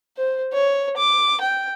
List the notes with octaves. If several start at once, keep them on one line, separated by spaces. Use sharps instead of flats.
C5
C#5
D6
G5